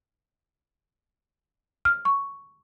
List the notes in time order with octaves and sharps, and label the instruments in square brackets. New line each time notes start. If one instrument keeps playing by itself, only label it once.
[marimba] F6
[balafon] C#6